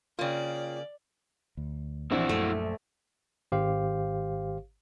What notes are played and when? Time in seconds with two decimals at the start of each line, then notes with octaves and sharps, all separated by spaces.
0.19 C#3 A#3 F4 C#5 D5 G5
1.57 D2
2.12 A#1 E3 C4 D4 E4 F#4
2.29 F#2 A3
3.52 G#1 G4 C5 F5